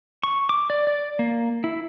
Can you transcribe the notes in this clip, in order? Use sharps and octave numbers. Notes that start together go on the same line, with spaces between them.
C#6
D6
D5
D5
A#3
E4